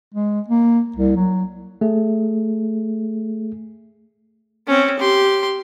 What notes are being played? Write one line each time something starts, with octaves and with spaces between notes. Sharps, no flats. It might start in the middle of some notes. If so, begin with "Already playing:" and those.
G#3
A#3
C2
F#3
A3 G#4
C4 C#4
G4 C6